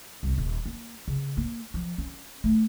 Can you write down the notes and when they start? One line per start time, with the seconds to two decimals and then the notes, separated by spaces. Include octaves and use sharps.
0.23 C2
0.38 D#1
0.66 A#3
1.08 C#3
1.37 A#3
1.74 F3
1.98 C#4
2.44 A3